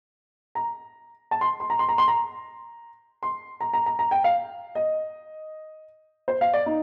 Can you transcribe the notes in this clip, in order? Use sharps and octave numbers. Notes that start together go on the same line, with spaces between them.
A#5
A5
C6
C6
A#5
C6
A#5
C6
A#5
C6
A#5
A#5
A#5
A#5
G5
F5
D#5
C5
F5
D5
D#4